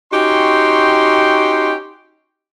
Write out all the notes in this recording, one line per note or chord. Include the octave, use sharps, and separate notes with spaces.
C#4 D#4 F#4 G4 G5 C6